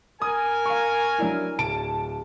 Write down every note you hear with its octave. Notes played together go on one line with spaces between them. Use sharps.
A#4 G#5 D#6
F5 C#6
F#3 D4 E4
D1 A5 D7